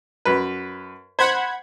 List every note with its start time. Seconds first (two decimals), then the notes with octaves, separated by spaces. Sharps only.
0.25 F#2 B4
1.19 C5 F#5 B5 G#6